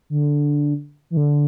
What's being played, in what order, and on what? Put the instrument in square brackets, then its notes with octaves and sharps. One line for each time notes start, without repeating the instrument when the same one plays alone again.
[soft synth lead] D3
E3
D3